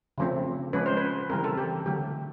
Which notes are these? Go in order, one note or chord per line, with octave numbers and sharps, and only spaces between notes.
C#3 F3 A3 C4
F3 G#3 C#4 B4
C5
B4
C#3 E3 G3 C4 A#4
A4
G4
D3 F#3 A3 G4